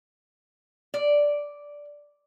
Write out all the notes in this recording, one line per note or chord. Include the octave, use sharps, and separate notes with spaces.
D5